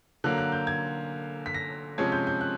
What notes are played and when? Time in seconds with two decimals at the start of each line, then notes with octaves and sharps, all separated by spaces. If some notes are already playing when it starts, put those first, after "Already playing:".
0.24 D3 F#3 A#3 F#6
0.38 F#6
0.52 G6
0.67 G#6
1.46 B6
1.54 A#6
1.98 C3 F3 G#3 C#4 G#6
2.12 G6
2.27 G6
2.41 F#6